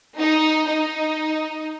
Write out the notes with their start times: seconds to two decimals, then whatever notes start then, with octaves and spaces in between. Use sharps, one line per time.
0.17 D#4
0.66 D#4